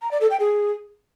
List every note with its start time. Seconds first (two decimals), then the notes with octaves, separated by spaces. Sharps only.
0.02 A#5
0.11 D5
0.21 A4
0.30 G5
0.40 G#4